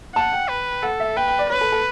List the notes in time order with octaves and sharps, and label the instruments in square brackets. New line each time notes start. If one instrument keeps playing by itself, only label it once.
[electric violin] F#5 [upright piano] A5
[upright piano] G5
[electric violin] B4
[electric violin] A4 [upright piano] F#5
[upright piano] E5
[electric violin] B4 [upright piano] G5
[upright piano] G5
D5
[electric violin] B4 [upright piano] C#5
[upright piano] A4
A4